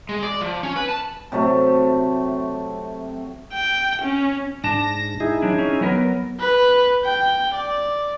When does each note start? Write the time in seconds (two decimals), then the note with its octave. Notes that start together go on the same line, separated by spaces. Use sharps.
0.09 G#3
0.23 D5
0.41 F3
0.63 C#4
0.76 B4
0.89 A5
1.32 C3 F#3 A3
3.53 G5
4.02 C#4
4.64 G#2 D4 A5 A#6
5.20 D#4 E4 G#4
5.42 F#3 D4
5.59 C#4
5.81 F#3 B3 A#4
6.40 B4
7.04 G5
7.54 D5